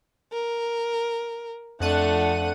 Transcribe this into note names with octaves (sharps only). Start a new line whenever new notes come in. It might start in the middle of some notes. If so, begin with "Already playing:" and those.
A#4
F2 A3 D4 F#5 D#7